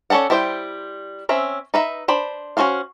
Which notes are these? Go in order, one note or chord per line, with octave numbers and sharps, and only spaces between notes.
C#4 E4 A4 D5 F#5
G3 E4 C5 D#5 G5
C4 C#4 E5
D#4 B4 E5
D4 C5 B5
C#4 D#4 F#4 C5 F5